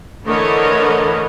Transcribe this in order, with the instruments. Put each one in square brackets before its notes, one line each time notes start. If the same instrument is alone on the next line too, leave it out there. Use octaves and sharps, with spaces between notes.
[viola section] D3 E3 A3 A#4 C#5 D#5